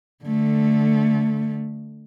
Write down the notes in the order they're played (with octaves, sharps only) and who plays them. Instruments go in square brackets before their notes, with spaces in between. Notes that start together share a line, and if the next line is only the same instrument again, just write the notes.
[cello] D3 A3